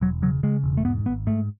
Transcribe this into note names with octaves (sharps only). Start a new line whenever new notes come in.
E1 F#3
C#3 F#3
C#3 G#3
E1
A3
G#2 B3
G#1 B3
G#2 A3